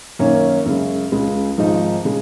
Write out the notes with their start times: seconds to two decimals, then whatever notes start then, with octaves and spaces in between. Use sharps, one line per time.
0.19 F#2 D#3 A#3 C#4
0.66 F#2 C#3 G#3
1.12 C#2 C#3 G#3
1.58 G#1 G#2 F3 G#3 D#4
2.05 C#3 G#3